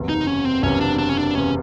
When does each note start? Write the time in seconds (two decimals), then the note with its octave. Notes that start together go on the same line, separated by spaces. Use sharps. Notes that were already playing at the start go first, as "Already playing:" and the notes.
Already playing: F#1 E2 C3
0.09 D#4
0.27 C#4
0.45 C4
0.63 F#1 E2 C3 C#4
0.81 D4
0.98 D4
1.09 C#4
1.17 D4
1.35 E2 C3 C#4